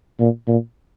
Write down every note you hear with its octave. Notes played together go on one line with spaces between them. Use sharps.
A#2
A#2